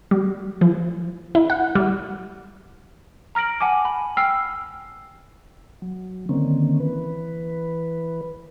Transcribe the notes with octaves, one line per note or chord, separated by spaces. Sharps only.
G3
F3
E4
F#5
G3
A#5 F6 A#6 D7 F#7
F#5 G#5 A5 D6
B5
G5 E6 F6 C7
F#3
D3 D#3 A#3 C4 C#4
E3 B4